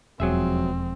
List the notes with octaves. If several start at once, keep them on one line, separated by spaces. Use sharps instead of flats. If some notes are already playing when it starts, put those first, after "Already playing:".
E1 F2 F3 F#3 G#3 C4 G#4 E5